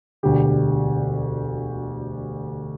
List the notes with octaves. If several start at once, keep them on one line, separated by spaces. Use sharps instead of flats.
E1 D2 D3 G4